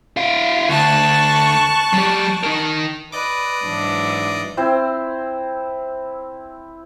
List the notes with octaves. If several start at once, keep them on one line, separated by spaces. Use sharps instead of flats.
E4 F5
D2 A5 C#6 F#6
F#3 G4
D#4 A#4
B4 D5 D#5 D6
G#2 E3 F#3 D4
C4 E4 C5